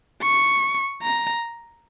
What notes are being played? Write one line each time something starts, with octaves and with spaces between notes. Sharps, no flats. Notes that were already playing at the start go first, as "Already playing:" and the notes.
C#6
A#5